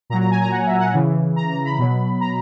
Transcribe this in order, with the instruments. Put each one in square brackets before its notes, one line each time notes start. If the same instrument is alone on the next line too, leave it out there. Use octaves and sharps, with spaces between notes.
[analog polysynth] A#2 A#5
F#3
A#5
G#5
A#5
F#5
E5
F#5
C#3 E3
A#5
A#5
B5
B2 F#3
A#5